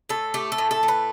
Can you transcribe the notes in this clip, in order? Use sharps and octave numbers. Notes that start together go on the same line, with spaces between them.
A2 A4
A3 G4
A4
A2
A4
A3
B4